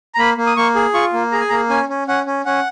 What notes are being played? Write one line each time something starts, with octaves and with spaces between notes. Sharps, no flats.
A#5
A#3 B5
A#3
D#6
A#3 C#6
G#4
F4 C#6
A#3
G#4 A#5
G#5
A#3 A#5
C#4 G#5
C#4
C#4 F#5
C#4
C#4 F#5